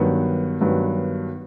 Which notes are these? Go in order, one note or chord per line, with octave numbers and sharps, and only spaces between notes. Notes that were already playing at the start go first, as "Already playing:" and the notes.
Already playing: G2 D#3 F#3 B3
G2 D#3 F#3 B3